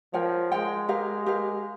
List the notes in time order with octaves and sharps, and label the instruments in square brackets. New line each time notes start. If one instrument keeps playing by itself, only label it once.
[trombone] F3 [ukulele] A#4 C#5 G5
[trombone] G#3 [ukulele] A#4 C#5 G5
[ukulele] G4 A#4 F5
G4 A#4 F5